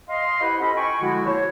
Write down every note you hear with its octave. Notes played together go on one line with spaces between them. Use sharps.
D#5 F5 C6
E4 G4 B4 C5 F#5 B5
C#4 F4 A4 D#5 B5
G5 G#5 B5 C#6
D3 F3 G#3 E4 F#4
A#3 E4 C5 C#5